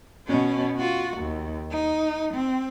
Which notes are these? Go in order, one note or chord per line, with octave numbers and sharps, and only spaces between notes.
B2 C#4
F4 F#4
D#2
D#4
C4